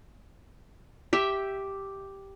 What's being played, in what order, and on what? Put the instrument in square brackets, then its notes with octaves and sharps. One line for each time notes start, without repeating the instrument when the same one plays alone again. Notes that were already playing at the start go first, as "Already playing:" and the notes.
[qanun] G4 E5